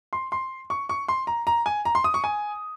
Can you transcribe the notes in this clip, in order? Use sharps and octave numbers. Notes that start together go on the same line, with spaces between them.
C6
C6
C#6
C#6
C6
A#5
A#5
G#5
A#5
C6
D#6
C#6
G#5